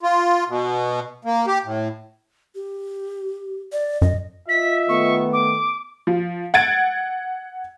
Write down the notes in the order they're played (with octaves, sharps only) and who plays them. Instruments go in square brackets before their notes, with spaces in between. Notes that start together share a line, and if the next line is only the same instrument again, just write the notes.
[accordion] F4
B2
A#3
G4
A2
[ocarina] G4
D5
[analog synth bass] F#2 [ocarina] D#5
[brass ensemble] F4 D#5 E5 [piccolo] B6
[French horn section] D#3 A3 B3 [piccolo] C#6
[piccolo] D6
[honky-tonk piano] F3
F#5 G#6 A6 D7